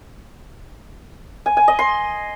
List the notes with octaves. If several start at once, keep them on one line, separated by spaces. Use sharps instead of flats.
G#5
G#5
D#5
C6